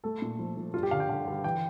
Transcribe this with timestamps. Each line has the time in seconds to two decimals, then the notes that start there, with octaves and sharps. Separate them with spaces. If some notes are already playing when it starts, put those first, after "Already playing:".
0.04 A3 A4
0.22 A#2
0.39 F3
0.57 F3
0.74 G2 F4
0.83 G4
0.91 D3 F5
1.00 G5
1.09 D3 F5
1.27 G2
1.44 E3 G5